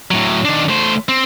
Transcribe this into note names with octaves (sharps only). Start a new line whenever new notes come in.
A2 F#3
D#3 D4
A3 C5
C4